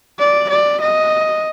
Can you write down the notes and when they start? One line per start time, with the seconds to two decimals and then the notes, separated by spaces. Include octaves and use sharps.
0.19 D5
0.49 D5
0.81 D#5